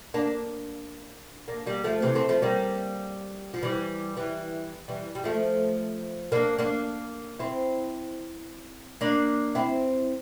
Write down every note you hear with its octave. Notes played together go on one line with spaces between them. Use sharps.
A#3 D4
A#3 D4
G3 A#3
F3 A3
C3 E3
A3 C4
F3 A3
G3 A#3
F3
E3 G3
E3 G3
E3 G3
G3
F3 A3
A#3 D4
A#3 D4
C4 E4
A#3 D4
C4 E4